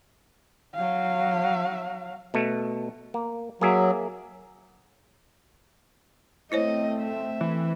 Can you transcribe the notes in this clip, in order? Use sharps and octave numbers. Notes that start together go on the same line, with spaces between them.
F#3 F5
B2 A3
A#3
F#3 A#3 G#4 E5
A3 C4 E4 C5 C#5 D#5
E5
E3